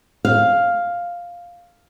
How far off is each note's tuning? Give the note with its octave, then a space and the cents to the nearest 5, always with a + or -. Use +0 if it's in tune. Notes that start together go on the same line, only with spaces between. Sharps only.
F5 +5